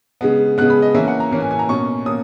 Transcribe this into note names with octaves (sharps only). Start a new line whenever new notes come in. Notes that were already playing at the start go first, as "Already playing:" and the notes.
C#3 G#3 B3
C#3 G#3 B3 F#6
B5
D#5
E3 A#3 C#4 E5
F#5
A#5
E3 A#3 C#4
G#5
G#5
A#5
B2 A#3 C#4 C#6
A#3 C#4 D#6